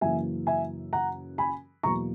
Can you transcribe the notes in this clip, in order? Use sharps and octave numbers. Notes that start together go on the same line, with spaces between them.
F#2 C#3 E3 A#3 E5 G#5
E5 G#5
F#5 A#5
G#5 B5
E2 B2 F#3 A#3 A#5 C#6